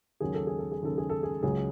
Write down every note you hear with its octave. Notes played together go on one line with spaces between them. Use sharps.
D#2 C#3 F#3 G#4
A4
G#4
A4
G#4
D#2 C#3 F#3 A4
G#4
A4
G#4
C#2 C#3 F#3 G#4